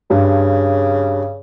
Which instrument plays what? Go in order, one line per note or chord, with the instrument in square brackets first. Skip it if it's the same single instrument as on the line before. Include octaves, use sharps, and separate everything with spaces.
[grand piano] G2 [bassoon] C#3